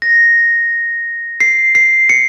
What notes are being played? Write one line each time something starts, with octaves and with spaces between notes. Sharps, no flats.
A#6
C7
C7
C#7